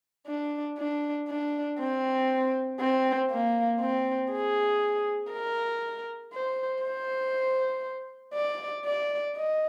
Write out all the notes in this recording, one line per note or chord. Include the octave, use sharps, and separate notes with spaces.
D4
D4
D4
C4
C4
A#3
C4
G#4
A#4
C5
C5
D5
D5
D#5